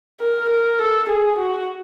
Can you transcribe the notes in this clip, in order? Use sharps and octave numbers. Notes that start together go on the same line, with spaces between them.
A#4
A#4
A4
G#4
F#4